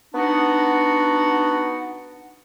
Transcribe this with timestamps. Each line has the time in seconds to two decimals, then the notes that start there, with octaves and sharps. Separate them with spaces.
0.14 B3 D4 D#4 F#4 F#5